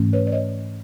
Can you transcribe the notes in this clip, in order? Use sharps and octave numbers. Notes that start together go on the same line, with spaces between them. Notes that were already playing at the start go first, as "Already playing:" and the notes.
Already playing: G#2 E3 A3 C#4
B4 C#5
D5
C#5 D#5